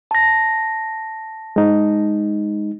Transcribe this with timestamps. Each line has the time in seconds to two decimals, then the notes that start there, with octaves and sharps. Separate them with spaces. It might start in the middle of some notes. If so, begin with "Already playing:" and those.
0.11 A5 A#6
1.56 G#3 D#4